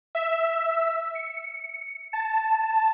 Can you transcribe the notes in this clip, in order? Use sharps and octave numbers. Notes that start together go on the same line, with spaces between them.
E5
C#7
A5